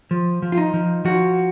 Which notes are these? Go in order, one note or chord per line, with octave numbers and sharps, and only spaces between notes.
F3
F3
F4
D#4
F3
F3 F#4